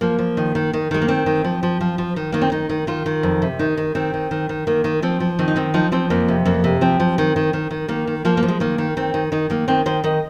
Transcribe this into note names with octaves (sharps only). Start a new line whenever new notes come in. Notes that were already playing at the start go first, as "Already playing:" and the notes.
F3 A#3
F3
D#3
D#3
D#3
D#3 G#3
A#3
D#3 C4
D#3
F3
F3
F3
F3
D#3
D#3 A#3
C4
D#3 D#4
D#3
D#3 F4
D#3
F2
C3
D#3 D#4
D#3
D#3 C4
D#3
D#3
D#3
D#3 A#3
D#3
F3 C4
F3
D#3 C4
D#4
D#3 C4
F3 D#4
F3 C4
F2 A#3
C3
F2 A#3
C3
F3 C4
F3
D#3
D#3
D#3
D#3
D#3 A#3
D#3
F3 A#3
A#3
F3
G#3
D#3 A#3
D#3
D#3 C4
D#3
D#3 D#4
D#3 A#3
D#3 C4
D#3 C5
D#3 D#5